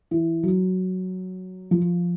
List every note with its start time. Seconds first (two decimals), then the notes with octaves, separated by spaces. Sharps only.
0.11 E3 E4
0.43 F#3 F#4
1.71 F3 F4